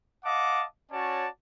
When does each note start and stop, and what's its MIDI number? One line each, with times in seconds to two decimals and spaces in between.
0.24 0.65 75
0.24 0.65 77
0.24 0.65 78
0.24 0.65 81
0.24 0.65 86
0.91 1.26 61
0.91 1.26 66
0.91 1.26 73
0.91 1.26 74
0.91 1.26 81